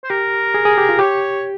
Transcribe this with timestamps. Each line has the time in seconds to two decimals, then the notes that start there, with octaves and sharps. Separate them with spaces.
0.04 C5
0.10 G4 A#4
0.54 G#4
0.65 G#4
0.78 G4
0.89 F4
0.99 G4 C#5